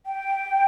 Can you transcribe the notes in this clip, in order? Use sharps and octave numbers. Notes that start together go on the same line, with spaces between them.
G5